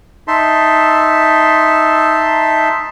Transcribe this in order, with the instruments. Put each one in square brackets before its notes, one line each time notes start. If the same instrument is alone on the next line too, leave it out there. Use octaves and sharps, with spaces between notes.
[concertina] D#4 E5 A5 C6